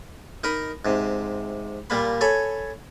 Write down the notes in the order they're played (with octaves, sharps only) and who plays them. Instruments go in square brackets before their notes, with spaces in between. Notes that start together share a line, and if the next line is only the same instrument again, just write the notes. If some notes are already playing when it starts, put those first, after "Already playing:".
[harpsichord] D#4 A#4 D#5 B5
G#2 C3
A#2 G3 A#3 B5
A4 C#5 G#5 B5